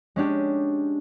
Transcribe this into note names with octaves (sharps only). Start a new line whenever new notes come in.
G#3 C#4 D4 G4